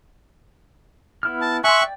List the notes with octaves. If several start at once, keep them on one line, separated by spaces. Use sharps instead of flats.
B3 E4 F6
A5
E5 G#5 C6 C#6 F#6
D5 G5